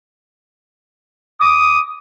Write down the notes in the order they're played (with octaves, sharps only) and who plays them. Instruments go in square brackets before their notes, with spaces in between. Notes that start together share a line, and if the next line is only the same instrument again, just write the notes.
[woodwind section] D6 D#6